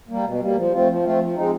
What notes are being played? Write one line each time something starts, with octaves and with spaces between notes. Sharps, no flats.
G3 A#3
B2
G3 A#3
F3
A3 C4 F4
F3
A3 C4 F4
F3
G#3 C4 D#4